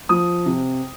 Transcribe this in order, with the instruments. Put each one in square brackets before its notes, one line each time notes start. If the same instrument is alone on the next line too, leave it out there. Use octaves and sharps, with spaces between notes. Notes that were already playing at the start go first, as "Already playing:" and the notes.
[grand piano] F3 D#6
C3